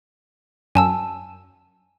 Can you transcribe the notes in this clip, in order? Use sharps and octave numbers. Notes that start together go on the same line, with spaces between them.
F#2 G#5 A5 E6